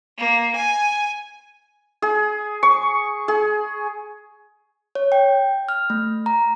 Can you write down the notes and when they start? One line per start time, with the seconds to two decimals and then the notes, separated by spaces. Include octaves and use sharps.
0.17 A#3
0.54 G#5
2.02 G#4
2.63 C#6
3.28 G#4
4.95 C#5
5.12 G5
5.69 F6
5.90 A3
6.26 A#5